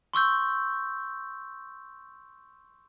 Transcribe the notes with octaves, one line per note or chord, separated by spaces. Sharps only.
C6 C#6 E6 G6